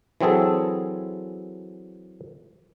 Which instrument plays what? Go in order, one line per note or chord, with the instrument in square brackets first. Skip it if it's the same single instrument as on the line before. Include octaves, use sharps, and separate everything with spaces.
[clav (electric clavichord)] E3 F#3 C4 G#4 A4